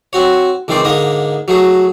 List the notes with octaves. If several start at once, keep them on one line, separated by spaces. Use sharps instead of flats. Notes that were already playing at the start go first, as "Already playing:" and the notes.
C4 F#4 C#5
C#2 D#3 E3 C4 C5 D5
G#2 D3 A#3 D#5 D#6
F#3 A3 G#4